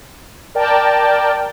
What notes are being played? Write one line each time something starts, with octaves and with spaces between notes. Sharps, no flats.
A#4 D5 G5 A5